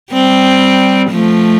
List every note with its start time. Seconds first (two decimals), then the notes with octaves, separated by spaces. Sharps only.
0.12 G3 C4
1.11 F3 A3